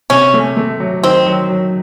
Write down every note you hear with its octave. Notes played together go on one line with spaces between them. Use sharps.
C3 C#4
A3
A3
F#3
D#3 C4
F#3
F#3